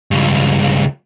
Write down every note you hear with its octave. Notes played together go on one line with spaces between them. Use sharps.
C#2 G2